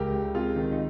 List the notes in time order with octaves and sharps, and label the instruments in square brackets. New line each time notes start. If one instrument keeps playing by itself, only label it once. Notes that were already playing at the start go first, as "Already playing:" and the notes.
Already playing: [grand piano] C#2 G4 A#4
C#2
C3 F4 G#4
D#3
D#4